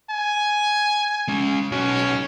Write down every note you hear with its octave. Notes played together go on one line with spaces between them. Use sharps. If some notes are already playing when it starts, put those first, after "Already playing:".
G#5
G#3 C#4
B1 C#4 F#4